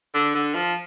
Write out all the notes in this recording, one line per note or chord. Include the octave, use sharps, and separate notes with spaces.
D3
D3
F3